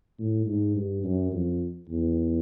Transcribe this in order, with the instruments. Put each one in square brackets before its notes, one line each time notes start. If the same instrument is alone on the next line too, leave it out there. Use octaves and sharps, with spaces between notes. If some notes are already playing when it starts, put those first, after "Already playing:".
[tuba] A2
G#2
G2
F#2
F2
E2